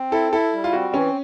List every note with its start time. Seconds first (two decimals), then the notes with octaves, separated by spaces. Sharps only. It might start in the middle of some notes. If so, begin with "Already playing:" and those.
Already playing: C4
0.12 E4 A4
0.32 E4 A4
0.53 G3
0.64 F4
0.73 C4 F#4
0.94 E3 C#4